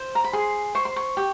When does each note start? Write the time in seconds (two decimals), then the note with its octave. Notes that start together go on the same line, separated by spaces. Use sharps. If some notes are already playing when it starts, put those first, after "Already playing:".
Already playing: C5
0.15 A#5
0.24 B5
0.33 G#4 C6
0.75 C5 C#6
0.85 C6
0.96 C#6
1.17 G4